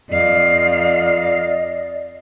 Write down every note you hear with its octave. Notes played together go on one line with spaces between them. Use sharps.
F2 D5 D#5 F5